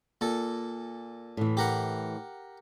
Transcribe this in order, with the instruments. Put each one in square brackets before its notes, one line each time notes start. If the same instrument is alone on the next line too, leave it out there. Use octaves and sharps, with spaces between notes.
[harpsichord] A#2 A4
[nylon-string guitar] A2 E3
[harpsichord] G4 A#4 F#5